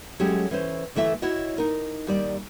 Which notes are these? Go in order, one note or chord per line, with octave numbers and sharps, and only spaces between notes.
F#3 G#3 A3 C#4 G4 G#4
E3 C#4 C5
D2 E3 A3 E4 E5
E4 F#4 C#5 D#5
D#4 A#4
D#2 G3 D5